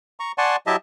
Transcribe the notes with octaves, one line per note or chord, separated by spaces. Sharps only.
A#5 C#6
D5 F#5 G#5 A5 C6 C#6
F#3 E4 G4 D#5 E5 A5